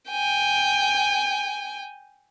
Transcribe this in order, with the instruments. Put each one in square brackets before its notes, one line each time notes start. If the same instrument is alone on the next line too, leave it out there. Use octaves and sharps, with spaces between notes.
[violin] G5 G#5